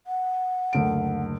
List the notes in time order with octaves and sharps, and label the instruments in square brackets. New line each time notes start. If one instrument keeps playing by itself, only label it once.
[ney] F#5
[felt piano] F#1 D2 D7